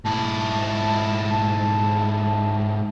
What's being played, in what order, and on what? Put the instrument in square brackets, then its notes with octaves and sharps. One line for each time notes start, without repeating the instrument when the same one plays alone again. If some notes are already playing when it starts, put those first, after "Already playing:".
[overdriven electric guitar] G#2 E4 [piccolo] A5